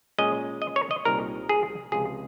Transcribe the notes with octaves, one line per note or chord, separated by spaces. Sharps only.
A#2 G#3 C#4 D#5
D#5
C#5
D#5
C2 A#2 G3 C4 D#4 A#4
G#4
C#2 C3 F3 G#4